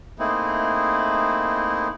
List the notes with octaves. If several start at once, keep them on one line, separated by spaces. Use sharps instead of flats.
A3 A#3 C4 D#4 E4 G#4